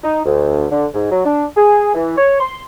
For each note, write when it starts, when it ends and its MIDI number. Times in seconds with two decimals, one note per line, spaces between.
0.04 0.20 63
0.25 0.66 38
0.71 0.86 50
0.94 1.11 44
1.11 1.22 54
1.25 1.45 62
1.57 1.90 68
1.94 2.15 52
2.17 2.40 73
2.40 2.64 84